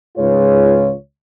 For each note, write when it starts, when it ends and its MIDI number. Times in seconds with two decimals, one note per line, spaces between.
0.18 0.92 37
0.18 0.92 44
0.18 0.92 65
0.18 0.92 68
0.18 0.92 71
0.18 0.92 73